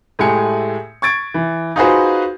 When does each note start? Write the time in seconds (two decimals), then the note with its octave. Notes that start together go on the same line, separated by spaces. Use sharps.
0.19 A2 G#3 A3 G4 G#5 C#7
1.02 C#6 G#6 A6 D7
1.34 E3
1.76 D#4 F4 F#4 G#4 B4 C5